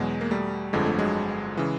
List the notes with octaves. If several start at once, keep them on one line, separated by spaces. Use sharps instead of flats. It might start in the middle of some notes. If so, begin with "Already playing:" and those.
Already playing: E2 B2 F#3 G#3
A#3
G3 A3
G1 F2 D3 F3 G#3
A3
F#3 G#3
C#3 E3